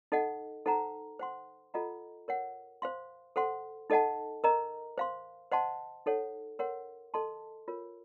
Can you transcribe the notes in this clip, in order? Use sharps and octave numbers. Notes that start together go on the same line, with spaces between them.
D#4 A4 D#5 F#5
D#4 A4 C5 F#5 A#5
C5 F#5 C6
F4 A4 D#5 F#5 A#5
A#4 C#5 F#5
C5 F5 C6
A4 C5 F#5 C6
D#4 A4 D#5 F#5 A5
A#4 D#5 A#5
C5 F5 C6
C5 D#5 F#5 A5 C6
D#4 A4 C#5 F#5
A#4 C#5 F#5 C6
A4 D#5 A5 C6
F4 A#4 C#5